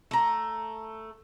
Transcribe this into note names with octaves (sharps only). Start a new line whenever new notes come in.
A3 A#5